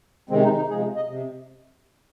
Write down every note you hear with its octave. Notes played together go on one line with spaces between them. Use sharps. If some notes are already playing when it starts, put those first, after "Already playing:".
C3 D#3 G#3 C4
D#4
D#4
C3 F3 G#3 G#4
D#5
C3